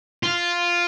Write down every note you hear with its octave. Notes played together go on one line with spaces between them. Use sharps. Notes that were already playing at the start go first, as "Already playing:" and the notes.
F4